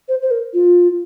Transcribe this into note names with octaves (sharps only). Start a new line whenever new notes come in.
C5
C5
A#4
F4